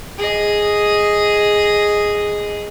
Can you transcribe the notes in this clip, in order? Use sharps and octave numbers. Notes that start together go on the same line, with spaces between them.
G#4 D#5